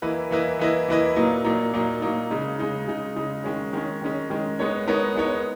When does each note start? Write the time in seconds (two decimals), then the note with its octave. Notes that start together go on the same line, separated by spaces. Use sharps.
0.02 E3 A#3 E4 B4 D#5
0.31 E3 A#3 E4 B4 D#5
0.59 E3 A#3 E4 B4 D#5
0.88 E3 A#3 E4 B4 D#5
1.16 A#2 F#3 A#3 D#4
1.45 A#2 F#3 A#3 D#4
1.73 A#2 F#3 A#3 D#4
2.02 A#2 F#3 A#3 D#4
2.30 C#3 G#3 D#4
2.59 C#3 G#3 D#4
2.88 C#3 G#3 D#4
3.16 C#3 G#3 D#4
3.44 D#3 G#3 C#4
3.73 D#3 G#3 C#4
4.02 D#3 G#3 C#4
4.30 D#3 G#3 C#4
4.59 G#3 B3 D#4 A#4 C#5
4.87 G#3 B3 D#4 A#4 C#5
5.15 G#3 B3 D#4 A#4 C#5